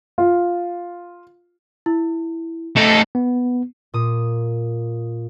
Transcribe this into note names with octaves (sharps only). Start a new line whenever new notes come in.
F4
E4
A3 D#4 A4 D7 E7
B3
A#2 D#6